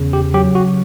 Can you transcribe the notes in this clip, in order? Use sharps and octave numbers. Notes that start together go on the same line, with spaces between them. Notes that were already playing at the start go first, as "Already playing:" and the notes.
Already playing: E2 C#3
G4
F#3 G4
F#4